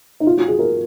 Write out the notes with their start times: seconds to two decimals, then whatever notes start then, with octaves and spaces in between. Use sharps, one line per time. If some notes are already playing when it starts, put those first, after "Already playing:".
0.20 D#4
0.27 F4
0.37 F#4
0.48 G#4
0.59 A#4